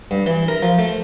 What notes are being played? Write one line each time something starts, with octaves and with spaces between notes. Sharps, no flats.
G2
E3
A#4
F3
A3